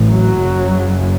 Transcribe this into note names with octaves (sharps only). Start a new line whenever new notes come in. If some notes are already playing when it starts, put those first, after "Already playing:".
Already playing: A1 A2
F#3
F#1 F#2 C#3